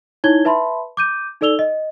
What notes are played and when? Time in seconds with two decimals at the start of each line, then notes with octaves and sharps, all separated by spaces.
0.24 D#4 E4 C#5 G#6 G7
0.45 B4 E5 A5 B5 C6
0.97 D6 G6 D#7
1.41 D#4 A4 D5 E6 F7 G7
1.59 D#5